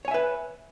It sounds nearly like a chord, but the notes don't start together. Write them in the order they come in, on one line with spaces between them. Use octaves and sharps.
C#5 G#5 E5 B4